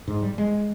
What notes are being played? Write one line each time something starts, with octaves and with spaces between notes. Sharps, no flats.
G#2
G3
G#3